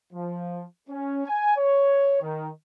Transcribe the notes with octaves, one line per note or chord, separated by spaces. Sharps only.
F3
C#4
G#5
C#5
D#3